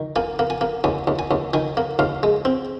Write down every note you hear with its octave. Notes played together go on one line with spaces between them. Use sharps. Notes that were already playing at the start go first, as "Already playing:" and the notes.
Already playing: D#3
A#3 G#5
A#3
G#5
A#3
D#2 G#5
D#2
G#5
D#2
D#3 G#5
A#3
D#2 F5
G#3
C4